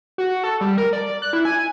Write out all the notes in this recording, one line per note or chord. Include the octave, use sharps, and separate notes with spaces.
F#4
A4
G3
A#4
D5
F#6
E4
G#5